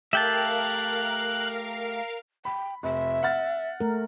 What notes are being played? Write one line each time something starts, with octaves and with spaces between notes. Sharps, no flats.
A3 G4 A#4 E5 F5 G5 A5 F#6
G5 B5
F1 E5
F#5 F6 A6
A3 A#4